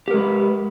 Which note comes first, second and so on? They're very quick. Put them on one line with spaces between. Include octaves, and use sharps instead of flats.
G4 A#4 G#3 B4